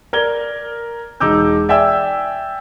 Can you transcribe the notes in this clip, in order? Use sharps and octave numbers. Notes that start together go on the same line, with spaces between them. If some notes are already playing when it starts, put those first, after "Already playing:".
A#4 D5 G#6 G7
E1 D#4 D6 E6 G6
D5 E5 G5 G#5 E6